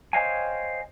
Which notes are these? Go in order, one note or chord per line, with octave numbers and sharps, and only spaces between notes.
C5 C#5 D#5 F5 G5 G#5